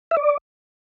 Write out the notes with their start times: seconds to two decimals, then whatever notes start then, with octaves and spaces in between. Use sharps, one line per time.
0.11 E5
0.17 D5